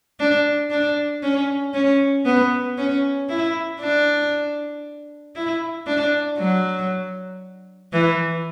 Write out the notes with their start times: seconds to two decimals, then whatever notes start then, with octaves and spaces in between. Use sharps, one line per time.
0.20 D4
0.70 D4
1.23 C#4
1.74 C#4
2.25 B3
2.78 C#4
3.29 E4
3.81 D4
5.35 E4
5.86 D4
6.38 F#3
7.93 E3